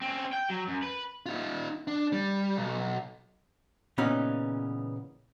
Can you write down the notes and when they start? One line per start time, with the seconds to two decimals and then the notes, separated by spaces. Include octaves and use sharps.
0.01 C4 C#4
0.33 G5
0.49 F#3
0.68 F#2
0.83 B4
1.26 D#4 F4
1.88 D4
2.13 G3
2.57 B1
3.98 A#2 C#3 E3 B3 C#4 D#4